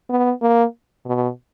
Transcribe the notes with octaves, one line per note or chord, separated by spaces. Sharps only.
B3
A#3
B2